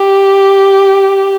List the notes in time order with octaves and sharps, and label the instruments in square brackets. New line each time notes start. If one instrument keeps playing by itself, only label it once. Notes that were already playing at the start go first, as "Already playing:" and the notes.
Already playing: [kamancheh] G4